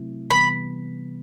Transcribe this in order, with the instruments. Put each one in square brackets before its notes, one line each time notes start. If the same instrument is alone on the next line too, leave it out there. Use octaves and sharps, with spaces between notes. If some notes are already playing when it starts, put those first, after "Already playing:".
Already playing: [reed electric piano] C3 F#3 A3 C4 E4
[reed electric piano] C3 E3 G3 B3 [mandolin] B5